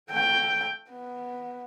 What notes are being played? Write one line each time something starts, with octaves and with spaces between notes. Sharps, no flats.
A3 G5
B3